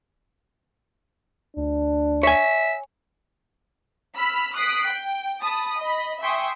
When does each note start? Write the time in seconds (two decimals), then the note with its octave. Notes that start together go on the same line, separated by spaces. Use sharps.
1.56 D2 D4
2.23 C#5 E5 G#5
4.17 B5 E6 F6
4.55 D#6 F#6 B6 C7 D7
4.89 G5
5.41 A5 B5 D#6
5.78 D#5 B5
6.21 E5 G5 G#5 C6 C#6 D#6